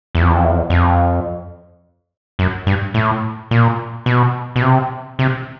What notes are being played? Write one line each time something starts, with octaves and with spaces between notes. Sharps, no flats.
E2
F2
E2
F2
E2
F2
E2
F2
F#2
G2
A2
A#2
B2
B2
C3
C3